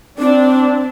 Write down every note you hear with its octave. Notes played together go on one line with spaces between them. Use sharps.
C4 D4